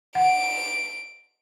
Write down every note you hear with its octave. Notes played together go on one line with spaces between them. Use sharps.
F#5 D7